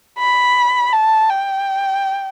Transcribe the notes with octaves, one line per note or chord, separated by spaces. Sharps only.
B5
A5
G5